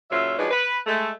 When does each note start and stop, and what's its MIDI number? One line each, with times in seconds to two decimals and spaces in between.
0.10 0.37 46
0.10 0.37 49
0.10 0.37 54
0.10 0.37 65
0.10 0.37 76
0.38 0.47 53
0.38 0.47 54
0.38 0.47 56
0.38 0.47 62
0.38 0.47 63
0.38 0.47 71
0.51 0.77 71
0.86 1.10 56
0.86 1.10 57